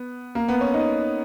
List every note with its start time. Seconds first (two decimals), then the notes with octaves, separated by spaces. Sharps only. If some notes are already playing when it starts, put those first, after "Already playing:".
Already playing: B3
0.35 A#3
0.48 B3
0.61 C#4
0.74 D#4